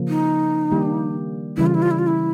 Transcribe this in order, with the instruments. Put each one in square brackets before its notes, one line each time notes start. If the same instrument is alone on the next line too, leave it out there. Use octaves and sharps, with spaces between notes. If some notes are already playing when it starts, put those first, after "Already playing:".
Already playing: [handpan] C#3 F3 A#3
[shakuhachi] D#4
[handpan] D#3 G3 A#3 D4 G4
[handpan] C#3 E3 G3 [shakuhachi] E4
[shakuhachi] F4
E4
F4
E4
F4
E4